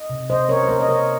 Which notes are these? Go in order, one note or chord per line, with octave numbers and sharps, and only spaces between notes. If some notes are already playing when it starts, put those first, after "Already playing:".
Already playing: D#5
C3
C3 C5 D#5
C3 A#4 C#5
C5
A#3 A#4 C#5
D#5
C3 A#4 C#5